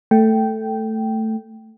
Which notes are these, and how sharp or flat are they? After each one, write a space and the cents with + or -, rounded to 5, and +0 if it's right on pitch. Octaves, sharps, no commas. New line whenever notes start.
A3 +5 G5 -10